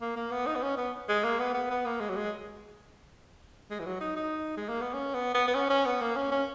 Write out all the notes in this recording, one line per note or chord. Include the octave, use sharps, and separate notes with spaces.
A#3
A#3
B3
D#4
B3
C#4
B3
G#3
A#3
B3
B3
B3
A#3
G#3
F#3
G#3
G#3
E3
F#3
D#4
D#4
G#3
A#3
B3
C#4
B3
B3
B3
C#4
C#4
B3
A#3
C#4
C#4